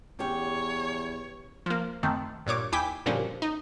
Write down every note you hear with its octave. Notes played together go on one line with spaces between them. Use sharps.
E2 C#4 G4 C#5
F3 A#3
F#2 D#3 A3 C4
G2 A#2 C#5 D6
D#2 E4 G5 G#5 D6 B6
F#2 A#2 D3 F3 G3 C#4
D#4